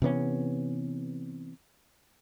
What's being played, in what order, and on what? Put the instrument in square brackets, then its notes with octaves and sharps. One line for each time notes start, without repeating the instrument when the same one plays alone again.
[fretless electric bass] C3 E3 B3 C#4